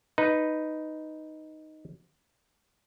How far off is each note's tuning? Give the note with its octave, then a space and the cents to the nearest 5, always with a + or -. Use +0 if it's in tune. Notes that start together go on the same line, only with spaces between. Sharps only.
D#4 +0 B4 +0